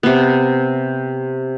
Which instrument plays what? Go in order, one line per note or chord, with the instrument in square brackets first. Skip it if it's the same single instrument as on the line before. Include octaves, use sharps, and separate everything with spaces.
[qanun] C3 B3